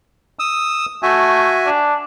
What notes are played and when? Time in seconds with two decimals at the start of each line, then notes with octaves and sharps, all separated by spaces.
0.39 D#6 E6
1.03 A3 F#4 E5 G#5
1.66 D4